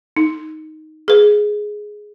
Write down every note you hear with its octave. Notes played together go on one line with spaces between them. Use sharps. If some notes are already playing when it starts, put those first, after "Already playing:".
D#4
G#4 B4